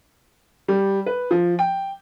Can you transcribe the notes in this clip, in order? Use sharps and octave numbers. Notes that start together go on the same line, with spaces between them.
G3
B4
F3
G5